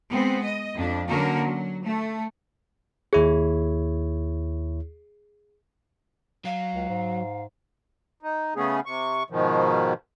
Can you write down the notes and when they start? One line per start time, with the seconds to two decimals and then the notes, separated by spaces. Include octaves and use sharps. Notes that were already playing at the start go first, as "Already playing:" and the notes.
0.10 G#3 B3 C4
0.43 D#5
0.75 F2 D4
1.08 D3 F#3 A#3 C#4 F#4 A#4
1.42 F#3
1.84 A3
3.13 D#2 E4 G#4 C#5
6.45 F#3 F5
6.75 C#2
6.89 G#2
8.23 D#4
8.56 C#3 A3 B3 C#4 G#4
8.86 C3 C#6
9.30 G#2 B2 D#3 F3